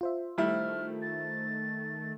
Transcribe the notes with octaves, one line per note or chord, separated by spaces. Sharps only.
F4 C5 E5
D#3 G3 A3 E4 F6
A6